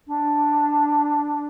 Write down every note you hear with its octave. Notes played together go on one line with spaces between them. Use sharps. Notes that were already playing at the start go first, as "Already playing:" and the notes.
D4